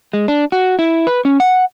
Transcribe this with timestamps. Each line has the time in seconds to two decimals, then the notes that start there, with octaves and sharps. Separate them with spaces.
0.13 G#3
0.28 D4
0.52 F#4
0.79 E4
1.07 B4
1.25 C#4
1.40 F#5